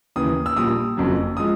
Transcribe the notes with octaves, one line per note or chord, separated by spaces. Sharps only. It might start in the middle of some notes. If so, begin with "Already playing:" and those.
D#2 C#3 E3 D#6
E6
A#1 A#2 G3 D#6
F#1 F2 C#3 F#3
F3 G#3 D#6